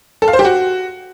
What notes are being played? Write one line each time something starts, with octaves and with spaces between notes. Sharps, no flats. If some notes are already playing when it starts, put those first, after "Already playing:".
A4
F5
C5
G4
F#4